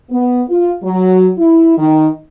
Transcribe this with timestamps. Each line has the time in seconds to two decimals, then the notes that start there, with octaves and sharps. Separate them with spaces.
0.11 B3
0.49 F4
0.83 F#3
1.38 E4
1.78 D#3